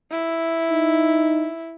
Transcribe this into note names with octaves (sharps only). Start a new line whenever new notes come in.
E4
D#4